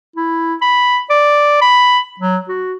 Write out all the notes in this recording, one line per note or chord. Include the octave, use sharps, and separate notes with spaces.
E4
B5
D5
B5
F#3
F#4